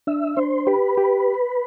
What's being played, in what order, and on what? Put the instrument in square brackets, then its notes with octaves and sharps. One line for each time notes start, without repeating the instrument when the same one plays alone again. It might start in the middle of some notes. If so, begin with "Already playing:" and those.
[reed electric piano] D4 [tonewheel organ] E5
[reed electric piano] D4 [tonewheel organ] C5
[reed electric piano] G4 [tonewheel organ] B4
[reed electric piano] G4